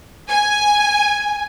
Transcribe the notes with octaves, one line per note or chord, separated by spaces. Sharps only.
G#5